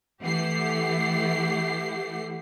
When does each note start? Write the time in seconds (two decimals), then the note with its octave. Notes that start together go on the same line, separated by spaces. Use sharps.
0.22 E3 A3 G4 F#5 C7